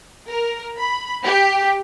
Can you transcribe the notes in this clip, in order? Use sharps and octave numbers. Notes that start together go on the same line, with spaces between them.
A#4
B5
G4